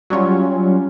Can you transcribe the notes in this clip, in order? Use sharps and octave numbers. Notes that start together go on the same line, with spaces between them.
F#3 G3 C#4 F4